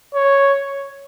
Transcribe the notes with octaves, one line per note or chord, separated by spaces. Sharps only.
C#5